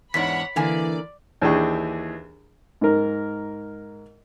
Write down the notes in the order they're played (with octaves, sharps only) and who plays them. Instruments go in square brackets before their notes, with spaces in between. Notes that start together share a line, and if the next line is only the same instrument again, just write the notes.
[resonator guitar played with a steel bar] E2 G#2 D4 [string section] C#5 F#5 B5 [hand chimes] B6
[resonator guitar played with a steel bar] D3 A#3 G#5 [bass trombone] E3 [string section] D5
[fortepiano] D#2 E3 D4 G#4 G5 C#6
G#2 A#4